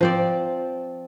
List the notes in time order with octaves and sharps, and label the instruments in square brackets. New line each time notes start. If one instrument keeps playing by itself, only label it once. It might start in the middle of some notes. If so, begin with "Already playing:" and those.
[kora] F3 C4 D5